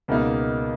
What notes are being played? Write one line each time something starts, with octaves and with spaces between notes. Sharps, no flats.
C#2 B2 A#3 D#4